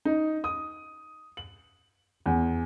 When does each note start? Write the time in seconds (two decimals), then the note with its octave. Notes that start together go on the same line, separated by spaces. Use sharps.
0.05 D#4
0.44 D#6
1.37 F#7
2.26 E2